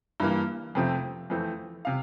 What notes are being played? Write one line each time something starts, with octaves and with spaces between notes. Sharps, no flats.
G2 E3 A#3
F2 C3 F3 A3 C4
F2 E3 A3 C4
C3 F5